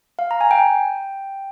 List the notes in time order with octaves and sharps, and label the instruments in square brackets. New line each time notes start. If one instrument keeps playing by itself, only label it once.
[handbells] F5
A#5
G#5
G5